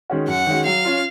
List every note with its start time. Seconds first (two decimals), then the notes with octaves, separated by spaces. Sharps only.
0.10 D#3 G#3 C#4 F#4
0.28 F#2 F#5
0.46 D#3 G#3 C#4 F#4
0.66 F#3 F5
0.85 C#4 F4